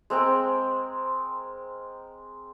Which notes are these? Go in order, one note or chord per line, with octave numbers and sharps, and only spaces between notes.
G#3 C4 A#4 G5